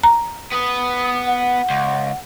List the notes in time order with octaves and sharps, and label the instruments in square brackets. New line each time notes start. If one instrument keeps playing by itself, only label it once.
[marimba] A#5
[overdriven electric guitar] B3 B4 [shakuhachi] D#6
[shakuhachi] F#5
[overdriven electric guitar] C#2